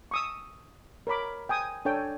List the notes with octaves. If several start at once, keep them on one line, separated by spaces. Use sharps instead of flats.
C#6 D#6 E6
A#4 C#5 B5 D6
G5 G#5 D#6
D4 A4 C#5 G5 G#5